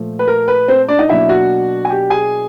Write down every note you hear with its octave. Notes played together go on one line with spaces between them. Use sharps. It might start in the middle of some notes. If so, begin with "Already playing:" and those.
Already playing: A#2 F3 A3
B4
A#4
B4
C4 C5
D4 D5
D#4 D#5
B2 F#3 A#3 D4 E4 E5
F#4 F#5
G#5
G4 G5
G#4 G#5